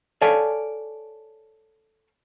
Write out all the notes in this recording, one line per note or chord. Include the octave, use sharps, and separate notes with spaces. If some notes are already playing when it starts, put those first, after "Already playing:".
A4 C#5 D5 F5 G#5